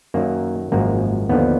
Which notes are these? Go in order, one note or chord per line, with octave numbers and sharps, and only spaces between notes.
F#2 D#3 F#3 A#3
G#1 F#2 F3 G#3 A#3
D#2 D3 F3 B3